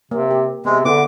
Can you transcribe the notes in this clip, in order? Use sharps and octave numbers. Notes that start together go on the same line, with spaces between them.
C3 A#3
G4
C3 G#3 B3 G#4
D3 B3 E4 D6